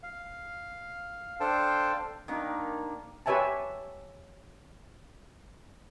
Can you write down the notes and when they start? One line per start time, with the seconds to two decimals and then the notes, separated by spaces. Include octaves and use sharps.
0.03 F5
1.40 D4 A4 C5 F5 G5 A5
2.28 D#3 A#3 D4
3.26 G4 B4 C#5 E5 G#5 A5